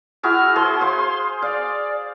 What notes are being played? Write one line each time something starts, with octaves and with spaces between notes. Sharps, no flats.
E4 F#4 G#4 F6
G#4 C5 C6
C5 F5
D5 F5